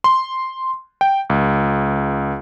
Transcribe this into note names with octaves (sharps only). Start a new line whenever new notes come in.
C6
G5
C#2